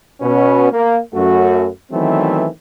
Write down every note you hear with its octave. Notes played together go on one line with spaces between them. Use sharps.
B2 C#4 B4
A#3
F#2 A3 F#4
D#3 E3 F#3 A3 B3 C4